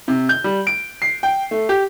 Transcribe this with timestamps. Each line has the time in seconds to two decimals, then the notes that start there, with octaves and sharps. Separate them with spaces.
0.08 C3
0.29 G6
0.44 G3
0.67 D7
1.02 C7
1.23 G5
1.51 A3
1.69 G4